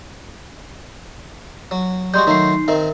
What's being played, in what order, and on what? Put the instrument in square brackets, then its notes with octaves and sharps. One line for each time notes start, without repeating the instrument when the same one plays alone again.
[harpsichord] F#3
[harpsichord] G3 G#3 F#4 [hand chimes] C6 G6
[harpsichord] D#3 F#3 A3 [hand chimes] D#4 C7
[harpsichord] D#3 C4 [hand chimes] A#4 E5